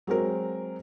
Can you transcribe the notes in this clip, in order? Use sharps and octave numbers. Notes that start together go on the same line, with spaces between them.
F#3 G#3 C4 A#4